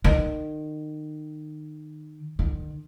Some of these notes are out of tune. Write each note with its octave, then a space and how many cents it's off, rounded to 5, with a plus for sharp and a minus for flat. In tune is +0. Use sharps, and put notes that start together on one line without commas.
D#3 -30
D#3 -45